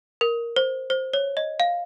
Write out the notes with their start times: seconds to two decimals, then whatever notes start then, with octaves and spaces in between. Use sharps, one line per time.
0.21 A#4
0.56 C5
0.90 C5
1.14 C#5
1.37 D#5
1.60 F5